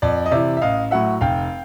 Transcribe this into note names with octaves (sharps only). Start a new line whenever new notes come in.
F2 D5
D#5
C3 E3 D5 E5
E5
A1 D#5 F5
A2 F#3 E5 F#5
F1 F5 G5